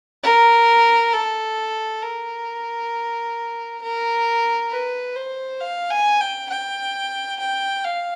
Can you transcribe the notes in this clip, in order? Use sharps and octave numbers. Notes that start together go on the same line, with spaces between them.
A#4
A4
A#4
A#4
B4
C5
F5
G#5
G5
G5
G5
F5